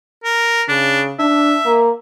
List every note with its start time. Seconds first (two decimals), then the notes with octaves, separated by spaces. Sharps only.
0.24 A#4
0.69 C#3 D4
1.19 D4 E5
1.66 A#3